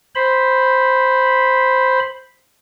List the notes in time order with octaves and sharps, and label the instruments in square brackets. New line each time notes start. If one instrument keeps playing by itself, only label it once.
[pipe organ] C5 B5